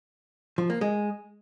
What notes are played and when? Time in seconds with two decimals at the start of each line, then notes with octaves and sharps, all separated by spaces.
0.58 F3
0.70 A#3
0.81 G#3